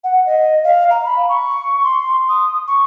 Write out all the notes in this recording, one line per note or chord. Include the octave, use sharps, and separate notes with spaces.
F#5
D#5
F5
A#5
B5
C#6
C6
D#6
C#6